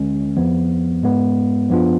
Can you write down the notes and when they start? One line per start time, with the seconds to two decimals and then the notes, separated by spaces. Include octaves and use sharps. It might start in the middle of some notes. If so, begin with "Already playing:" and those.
Already playing: D2 D3 G#3 C#4
0.37 F2 F3 B3
1.03 G#2 G#3 B3
1.70 F#2 F3 B3 D4 F4